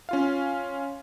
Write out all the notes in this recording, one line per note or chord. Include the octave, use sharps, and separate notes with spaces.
C#4 F4 F5